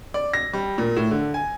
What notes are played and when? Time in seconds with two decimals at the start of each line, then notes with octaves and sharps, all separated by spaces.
0.14 D5
0.34 A#6
0.53 G3
0.78 A#2
0.97 A2
1.11 D3
1.34 G#5